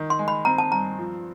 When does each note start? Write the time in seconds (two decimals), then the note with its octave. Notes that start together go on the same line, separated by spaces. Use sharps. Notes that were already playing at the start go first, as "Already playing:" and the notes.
Already playing: D#3
0.10 C6
0.19 G#3
0.28 B5
0.45 C4 A#5
0.58 A5
0.72 G2 A#5
0.98 F3